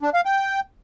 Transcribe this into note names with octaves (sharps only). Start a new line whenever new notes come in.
D4
F5
G5